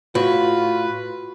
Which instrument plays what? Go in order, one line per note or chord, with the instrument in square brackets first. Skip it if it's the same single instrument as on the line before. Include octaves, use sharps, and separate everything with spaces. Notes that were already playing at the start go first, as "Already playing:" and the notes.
[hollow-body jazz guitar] A2 [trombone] F4 [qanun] F#4 [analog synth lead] B4